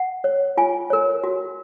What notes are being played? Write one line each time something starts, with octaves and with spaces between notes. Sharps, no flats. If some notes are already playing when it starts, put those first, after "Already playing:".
Already playing: F#5
C#5
F4 G#5
A#4 C#5
F#4